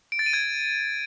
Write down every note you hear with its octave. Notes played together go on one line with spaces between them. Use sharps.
D7
A6
D#7
G#6